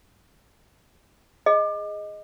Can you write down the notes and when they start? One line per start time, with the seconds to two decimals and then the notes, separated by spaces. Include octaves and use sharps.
1.46 G#4 D#5